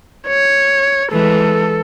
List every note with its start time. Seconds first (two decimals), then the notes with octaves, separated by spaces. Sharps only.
0.28 C#5
1.12 E3 G#3 A4